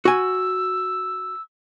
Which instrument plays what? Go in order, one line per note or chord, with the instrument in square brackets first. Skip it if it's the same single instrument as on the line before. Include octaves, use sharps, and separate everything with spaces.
[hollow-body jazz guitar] F#4 G#5 [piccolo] E6